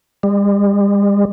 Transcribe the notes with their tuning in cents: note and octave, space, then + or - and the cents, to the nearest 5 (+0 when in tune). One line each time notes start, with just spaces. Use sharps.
G3 +45